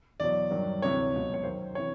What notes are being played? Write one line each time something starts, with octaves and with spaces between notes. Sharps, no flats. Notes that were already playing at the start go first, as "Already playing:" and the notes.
E2 B2 F#3 D5
G2 D#3 F#3
D2 C3 E3 C#5
C#2 B2 F#3
C#5
F#2 D#3 F#3 C5
C3 E3 C#5